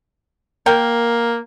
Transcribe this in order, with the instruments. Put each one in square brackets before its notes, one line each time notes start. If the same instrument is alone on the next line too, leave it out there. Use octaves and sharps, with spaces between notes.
[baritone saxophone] A#3 [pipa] A#4 G5